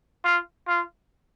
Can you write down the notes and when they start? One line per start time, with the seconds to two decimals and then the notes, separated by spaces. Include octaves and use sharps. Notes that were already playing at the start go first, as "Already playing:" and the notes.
0.24 F4
0.67 F4